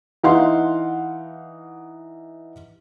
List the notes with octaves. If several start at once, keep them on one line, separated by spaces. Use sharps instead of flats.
E3 D#4 F5 F#5 C6